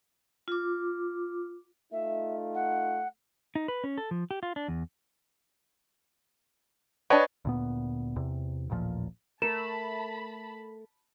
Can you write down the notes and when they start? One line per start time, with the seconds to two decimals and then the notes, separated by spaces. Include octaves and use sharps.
0.48 F4 D6
1.92 A3 D#4 F4 E5
2.54 F#5
3.55 D#4
3.68 B4
3.84 C#4
3.98 A4
4.11 F3
4.31 G4
4.43 F4
4.56 D4
4.68 E2
7.10 D4 B4 C#5 D#5 G5
7.45 D2 A#2 B3
8.16 E2 C3
8.70 A1 D#2 A#2 F3
9.42 A3 A#4 A5 B5 E7